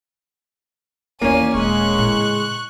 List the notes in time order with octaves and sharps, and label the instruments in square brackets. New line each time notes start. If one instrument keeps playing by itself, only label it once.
[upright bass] D#2 E3 [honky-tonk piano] A#3 C#4 [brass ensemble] C#5 D5 G#5 [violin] D#7
[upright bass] D#1 [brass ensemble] G#3 [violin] C#6 F#6
[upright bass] A2 C#3